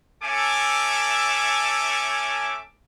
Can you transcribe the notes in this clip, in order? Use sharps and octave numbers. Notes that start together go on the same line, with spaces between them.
A3 C#4 A4 E5 G#5 D6